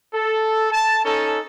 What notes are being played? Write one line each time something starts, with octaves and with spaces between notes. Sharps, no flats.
A4
A5
C#4 D#4 A4